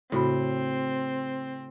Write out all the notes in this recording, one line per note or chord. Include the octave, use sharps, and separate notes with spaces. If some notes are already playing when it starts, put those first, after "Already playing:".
A2 C#3 C4 F#4 B5